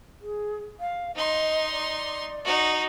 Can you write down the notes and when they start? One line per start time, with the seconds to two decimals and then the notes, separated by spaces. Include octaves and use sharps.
0.21 G#4
0.79 F5
1.15 D#4 D#5 C6
1.71 D5
2.45 D#4 F#4